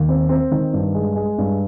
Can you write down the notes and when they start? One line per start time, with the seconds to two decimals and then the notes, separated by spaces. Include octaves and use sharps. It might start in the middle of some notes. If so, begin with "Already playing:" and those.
Already playing: D#2
0.09 C4
0.29 C4
0.51 D#3
0.73 G2
0.94 G#3
1.16 G#3
1.38 G2